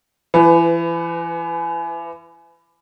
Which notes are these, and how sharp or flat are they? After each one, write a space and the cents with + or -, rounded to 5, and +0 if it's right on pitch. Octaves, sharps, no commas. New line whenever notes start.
E3 +35 B4 +20